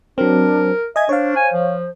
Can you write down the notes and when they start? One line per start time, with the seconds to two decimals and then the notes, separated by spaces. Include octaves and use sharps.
0.18 F#3 C4 D4 A#4
0.96 D#5 E5 G#5 G#6
1.09 D4 C5 C#5 F5
1.36 G#5
1.53 F3